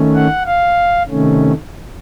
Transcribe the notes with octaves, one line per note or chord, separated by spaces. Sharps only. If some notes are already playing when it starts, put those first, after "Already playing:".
Already playing: D#3 A3 C#4
F#5
F5
C3 D#3 A3 C#4